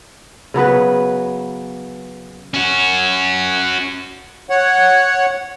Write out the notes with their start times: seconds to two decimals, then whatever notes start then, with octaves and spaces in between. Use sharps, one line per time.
0.54 C#3 F#3 B3 B4
2.54 C#4 F#4
4.50 C#5 F#5